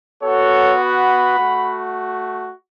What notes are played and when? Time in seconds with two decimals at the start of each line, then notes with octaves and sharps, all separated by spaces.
0.22 B3 F#4 A4 C#5
0.80 F#5 B5
1.38 A3 F#4